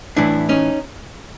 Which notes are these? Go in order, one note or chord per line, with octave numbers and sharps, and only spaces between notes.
A2 E3 D4 E4
C#4 D#4